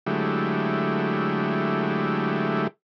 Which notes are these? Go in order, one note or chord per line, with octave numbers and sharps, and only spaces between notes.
D3 F#3 G#3 A3 E4 G4